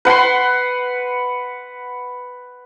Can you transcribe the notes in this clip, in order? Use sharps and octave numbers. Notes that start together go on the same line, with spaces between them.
B4 F#5 B5 C6